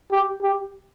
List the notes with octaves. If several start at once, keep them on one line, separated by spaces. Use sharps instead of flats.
G4
G4